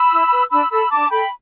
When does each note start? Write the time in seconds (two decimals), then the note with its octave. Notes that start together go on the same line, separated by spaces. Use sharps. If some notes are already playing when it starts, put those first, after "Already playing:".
Already playing: B5 E6
0.12 E4
0.31 B4
0.51 D4 B5 E6
0.70 A4 B5 E6
0.91 D4 A5 D6
1.10 A4 G5 B5